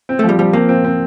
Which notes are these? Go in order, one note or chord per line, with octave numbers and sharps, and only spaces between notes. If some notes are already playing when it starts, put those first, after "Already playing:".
C4
F3 A3
G3
F3 G3
A#3 C4
C4
C4